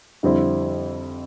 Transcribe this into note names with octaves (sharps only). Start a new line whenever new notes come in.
F2 D3 G3 C4 E4